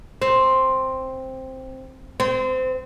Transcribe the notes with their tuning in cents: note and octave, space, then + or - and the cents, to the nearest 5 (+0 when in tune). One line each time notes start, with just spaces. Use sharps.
C4 +5
C4 -25